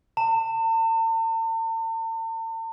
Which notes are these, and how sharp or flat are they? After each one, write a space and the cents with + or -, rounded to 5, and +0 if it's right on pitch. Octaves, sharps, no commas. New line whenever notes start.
A5 +45